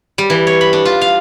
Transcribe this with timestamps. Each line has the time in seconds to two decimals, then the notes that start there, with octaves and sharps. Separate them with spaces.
0.18 G3
0.30 E3
0.47 C#5
0.61 B5
0.73 D4
0.85 F4
1.01 F5